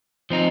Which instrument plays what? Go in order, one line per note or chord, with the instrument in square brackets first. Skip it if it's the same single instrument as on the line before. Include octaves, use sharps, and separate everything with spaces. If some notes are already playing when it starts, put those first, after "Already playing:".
[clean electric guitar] F3 C4 D#4